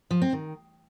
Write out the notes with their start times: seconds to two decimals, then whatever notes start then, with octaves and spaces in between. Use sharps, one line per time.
0.11 F3
0.22 C4
0.33 D#3